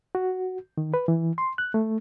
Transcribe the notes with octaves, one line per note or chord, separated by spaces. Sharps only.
F#4
D#3
B4
E3
C6
F#6
A3